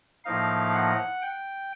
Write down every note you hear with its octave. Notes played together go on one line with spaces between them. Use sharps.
A2 F3 A#3 D#4 F5
F#5
G5